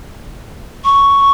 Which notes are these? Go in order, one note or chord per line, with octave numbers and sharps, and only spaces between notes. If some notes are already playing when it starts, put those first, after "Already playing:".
C#6